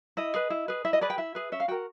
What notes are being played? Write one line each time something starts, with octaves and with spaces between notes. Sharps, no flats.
E4 D#5
G#4 B4
E4
G#4 B4
E4 E5
D#5
G#4 B4 D5
G5
E4 E5
G#4 B4
C#4 E5
F5
F#4 A#4 G5